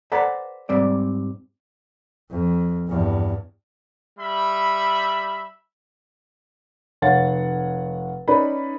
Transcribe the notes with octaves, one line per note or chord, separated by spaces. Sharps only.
A4 B4 C5 D5 F#5 A#5
G#2 G3 C4 D5
F2
E2 G2
G3 E5 B5
F1 C#5 F5 F#5 A6
C#4 D#4 B4 D5 B5